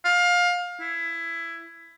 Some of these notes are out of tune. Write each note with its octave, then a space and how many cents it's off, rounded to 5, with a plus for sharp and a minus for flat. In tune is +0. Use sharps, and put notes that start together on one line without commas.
F5 +20
E4 +15